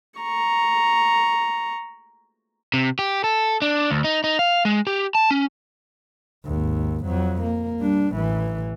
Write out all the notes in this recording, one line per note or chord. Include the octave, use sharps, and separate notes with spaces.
A#5 C#6
C3
G4
A4
D4
D2
D#4
D#4
F5
G#3
G4
A5
C#4
G#1 D#2
F2 F#3
A#3
G3 D4
A1 E3